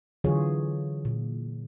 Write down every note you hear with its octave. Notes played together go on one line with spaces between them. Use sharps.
D3 E3 F#3 F4 G#4 C#5
A#2